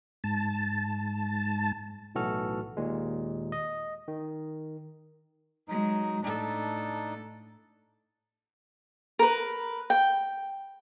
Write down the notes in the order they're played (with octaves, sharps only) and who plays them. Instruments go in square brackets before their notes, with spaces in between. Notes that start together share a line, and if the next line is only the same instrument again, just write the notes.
[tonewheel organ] G#2 A5
[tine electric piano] B1 A2 E3 F#4 A4 F6
D#2 A#2 G#3
D#5
D#3
[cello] F#3 G#3 [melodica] D#4
[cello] A2 A4 [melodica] D4 D#4
[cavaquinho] A#4 B4
G5